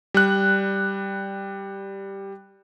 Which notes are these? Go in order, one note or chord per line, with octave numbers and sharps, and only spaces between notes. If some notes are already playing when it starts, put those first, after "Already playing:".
G3 F#6